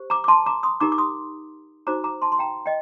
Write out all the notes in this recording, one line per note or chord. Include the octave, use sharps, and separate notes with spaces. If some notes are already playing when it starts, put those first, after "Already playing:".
Already playing: G4 C5
A#5 D6
D6
A5 C6
A#5 D6
C6 D#6
D#4 G4 A#4 A#5 D6
D6
C6 D#6
D#4 F#4 C5 A#5 D6
A#5 D6
A5 C6
C6
G5 A#5
D#5 G5